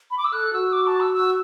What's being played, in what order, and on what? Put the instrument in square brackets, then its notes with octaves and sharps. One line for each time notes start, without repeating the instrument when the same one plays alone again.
[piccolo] B5
D6
E6
[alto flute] A4 [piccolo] F#6
[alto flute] F#4 [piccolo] E6
[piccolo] D6
A5
E6
E6